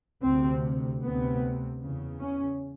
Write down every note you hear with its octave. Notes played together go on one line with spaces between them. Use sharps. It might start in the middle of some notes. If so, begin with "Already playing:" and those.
D2 C3 C4
D2 C3 B3
E2 C#3
C#4